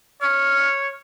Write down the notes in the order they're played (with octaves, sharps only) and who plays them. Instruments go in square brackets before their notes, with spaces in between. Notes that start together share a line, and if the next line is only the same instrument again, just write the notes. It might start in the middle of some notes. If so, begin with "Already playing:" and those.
[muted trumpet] C#5 [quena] F6